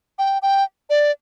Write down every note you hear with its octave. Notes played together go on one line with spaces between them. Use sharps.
G5
G5
D5